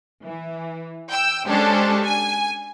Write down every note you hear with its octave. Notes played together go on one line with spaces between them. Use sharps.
E3
G5 E6
G#3 C#4 D4 G4 A4 C5
G#5